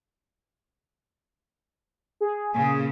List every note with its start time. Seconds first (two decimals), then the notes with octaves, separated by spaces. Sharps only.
2.21 G#4
2.54 A#2 C#3 G#4